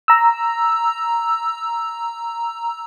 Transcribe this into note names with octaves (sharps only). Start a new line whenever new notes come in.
A#5 E6